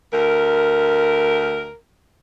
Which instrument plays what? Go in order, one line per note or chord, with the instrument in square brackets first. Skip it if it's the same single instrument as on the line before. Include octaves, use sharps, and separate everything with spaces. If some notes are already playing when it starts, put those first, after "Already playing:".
[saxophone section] D2 A#4